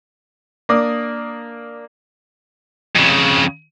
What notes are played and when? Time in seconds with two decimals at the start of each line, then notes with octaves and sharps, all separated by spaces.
0.69 A#3 D4 D5 D#6
2.96 F2 C#3